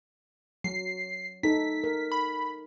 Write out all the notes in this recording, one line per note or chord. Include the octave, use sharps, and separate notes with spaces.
F#3 C7
D#4 A4 B6
A#4
B5